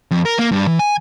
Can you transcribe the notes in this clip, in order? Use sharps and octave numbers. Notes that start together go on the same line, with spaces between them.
F2
A#4
A#3
G2
E3
G#5